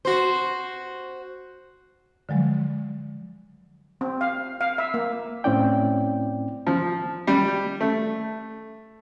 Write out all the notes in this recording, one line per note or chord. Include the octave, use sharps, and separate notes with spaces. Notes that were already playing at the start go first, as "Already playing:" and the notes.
F#4 C5
D3 F3 F#3 G#3
C4
F5
F5
E5
A#3
A2 C4 C#4 E4 D5 G5
F3
G3
A3